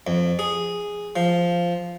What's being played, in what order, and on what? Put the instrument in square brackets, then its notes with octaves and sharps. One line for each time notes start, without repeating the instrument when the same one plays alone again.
[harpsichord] F2
G#4
F3